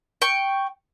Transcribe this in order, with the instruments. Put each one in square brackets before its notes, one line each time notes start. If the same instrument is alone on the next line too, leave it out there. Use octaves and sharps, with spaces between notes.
[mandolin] G5 C#6